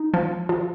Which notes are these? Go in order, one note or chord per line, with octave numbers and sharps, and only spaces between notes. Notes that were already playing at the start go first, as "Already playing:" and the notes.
Already playing: D#4
F3
F3